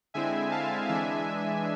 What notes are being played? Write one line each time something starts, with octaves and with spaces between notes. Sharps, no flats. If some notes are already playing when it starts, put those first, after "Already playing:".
D3 G#3 C4 E4 E5 G#5
F5 A5
E3 G#3 D4 E5 G#5